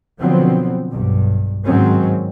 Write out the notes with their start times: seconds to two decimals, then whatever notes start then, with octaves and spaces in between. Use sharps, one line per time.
0.19 B2 D3 F3 F#3 B3 C4
0.90 B1 G2
1.65 G#2 D#3 F#3 C4 C#4